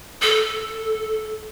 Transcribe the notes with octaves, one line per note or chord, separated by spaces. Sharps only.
A4